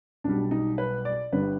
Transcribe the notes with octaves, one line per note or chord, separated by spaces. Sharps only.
B1 B2 G3 D4
D#4
B4
D5
G1 G2 D3 G3 B4